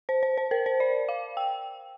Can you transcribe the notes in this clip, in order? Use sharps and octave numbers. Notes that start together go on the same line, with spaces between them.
C5
C5
C5
A#4
C5
D5
F5
G5